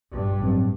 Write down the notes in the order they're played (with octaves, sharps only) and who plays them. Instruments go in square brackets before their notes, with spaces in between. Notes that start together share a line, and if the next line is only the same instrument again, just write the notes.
[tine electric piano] A1 [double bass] G2
[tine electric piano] A2 F#3 C4